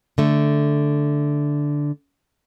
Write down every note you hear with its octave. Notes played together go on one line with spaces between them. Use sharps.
D3 A3